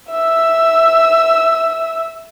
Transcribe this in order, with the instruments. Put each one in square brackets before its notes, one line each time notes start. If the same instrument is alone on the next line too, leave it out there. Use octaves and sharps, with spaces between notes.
[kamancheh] E5 E6